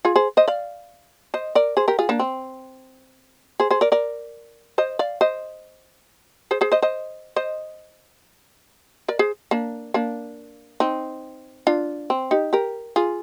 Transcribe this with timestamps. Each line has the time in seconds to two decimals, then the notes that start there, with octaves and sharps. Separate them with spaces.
0.05 F4 G#4
0.16 G#4 C5
0.37 C5 D#5
0.48 D5 F5
1.34 C5 D#5
1.55 A#4 D5
1.77 G#4 C5
1.88 G4 A#4
1.99 F4 G#4
2.09 A#3 D4
2.19 C4
3.60 G#4 C5
3.71 G#4 C5
3.81 A#4 D5
3.92 A#4 D5
4.78 C5 D#5
4.99 D5 F5
5.21 C5 D#5
6.51 G#4 C5
6.61 G#4 C5
6.72 C5 D#5
6.82 C5 D#5
7.36 C5 D#5
9.08 A#4 D5
9.19 G#4 C5
9.51 A#3 D4
9.94 A#3 D4
10.80 C4 D#4
11.67 D4 F4
12.10 C4
12.31 D#4 G4
12.53 G4 A#4
12.96 F4 G#4